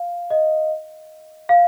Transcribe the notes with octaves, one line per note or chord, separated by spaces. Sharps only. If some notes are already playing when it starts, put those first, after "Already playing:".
Already playing: F5
D#5
F5